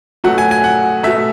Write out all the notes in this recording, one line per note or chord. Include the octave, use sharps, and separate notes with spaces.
B2 F#3 A3 F#5
G#5
G#5
F#5
B2 A3 E5